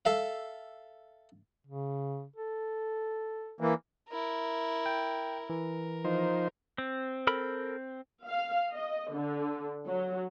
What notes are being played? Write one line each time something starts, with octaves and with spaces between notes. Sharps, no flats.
A4 E5 F5
C#3
A4
E3 A#3
E4 A#4
G5
E3 A#4
F3 D#4 C5
C4
A4 A#4 B5
F5
D#5
D3
F#3